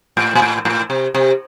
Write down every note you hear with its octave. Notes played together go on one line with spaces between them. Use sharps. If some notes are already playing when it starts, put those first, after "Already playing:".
A2
A#2
A2
A2
C3
C3